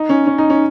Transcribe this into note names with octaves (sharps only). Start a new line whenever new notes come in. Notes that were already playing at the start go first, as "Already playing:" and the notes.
Already playing: D#4
C#4
C#4
D#4
C#4